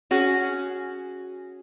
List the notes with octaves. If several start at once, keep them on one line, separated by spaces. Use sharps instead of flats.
C#4 F#4 G#4